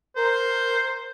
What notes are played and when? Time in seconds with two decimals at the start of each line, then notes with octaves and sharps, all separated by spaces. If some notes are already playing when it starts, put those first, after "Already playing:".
0.16 A#4 C5